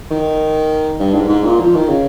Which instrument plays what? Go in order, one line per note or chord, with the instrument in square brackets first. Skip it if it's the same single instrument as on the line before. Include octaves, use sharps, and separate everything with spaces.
[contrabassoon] D#3
G2
G#2
G#2
A#2
F3
D#3
C#3